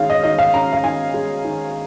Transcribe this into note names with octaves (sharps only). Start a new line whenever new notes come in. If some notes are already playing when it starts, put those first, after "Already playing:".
Already playing: D#3 G#3 C#4 F5
D#5
D#3 D#5
F5
C#4 A#5
F5
D#3 G#5
G#3
D#3